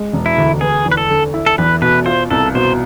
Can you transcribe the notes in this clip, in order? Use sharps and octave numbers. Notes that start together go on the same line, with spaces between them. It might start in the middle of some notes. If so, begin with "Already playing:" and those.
Already playing: G#3
E1
E4
D2
B3 G#4
E2
B4
A4
D3
E4
A4
E2 B4
B2 B4
F4 C5
C2 A4
B2 C5